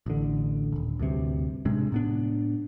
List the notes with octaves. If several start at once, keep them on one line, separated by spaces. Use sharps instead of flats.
A1 D3
D#1 G#1
D2 G2 C3
A2 C3 G#3 D4
A2 B3 D4